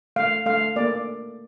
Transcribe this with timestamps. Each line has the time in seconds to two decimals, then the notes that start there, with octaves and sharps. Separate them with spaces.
0.16 A3 F5
0.46 A3 F5
0.76 A#3 D5